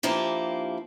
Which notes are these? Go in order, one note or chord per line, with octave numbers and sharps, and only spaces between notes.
G2 F3 A#3 E4 G4